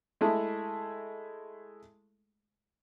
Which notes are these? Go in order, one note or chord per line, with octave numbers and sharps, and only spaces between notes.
G#3 A3 E4 G#4 A4